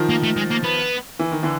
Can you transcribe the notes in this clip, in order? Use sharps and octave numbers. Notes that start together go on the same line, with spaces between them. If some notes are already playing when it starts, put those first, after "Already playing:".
Already playing: D#3 F3
A#3
A3
G#3
A#3
B3
E3
D#3
D3 E3